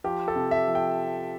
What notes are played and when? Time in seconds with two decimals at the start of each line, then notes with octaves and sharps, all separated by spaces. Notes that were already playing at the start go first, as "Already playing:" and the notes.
0.04 F3 G4
0.28 A4
0.36 C3
0.51 E5
0.67 F3
0.75 G5